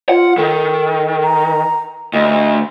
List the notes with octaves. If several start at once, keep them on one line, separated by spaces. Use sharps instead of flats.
F4 F#5
D#3 A4
A#5
D2 D#5